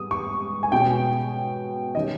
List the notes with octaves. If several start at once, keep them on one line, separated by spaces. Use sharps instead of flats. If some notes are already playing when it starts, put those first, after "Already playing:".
Already playing: G#2 G3 B3 D#6
C#6
G#5
B2 G#3 C#4 G5
D#3 G3 C#4 D#5